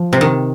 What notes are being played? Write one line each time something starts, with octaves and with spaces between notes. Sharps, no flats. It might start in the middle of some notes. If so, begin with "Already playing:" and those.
Already playing: F3
C3
D#3